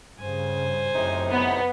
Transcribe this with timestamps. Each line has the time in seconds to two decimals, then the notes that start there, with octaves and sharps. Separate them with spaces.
0.19 G2 C#3 C5 G#5
0.94 F#2 A2 C3 D#4
1.33 B3